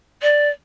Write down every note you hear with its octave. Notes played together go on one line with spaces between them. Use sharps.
D5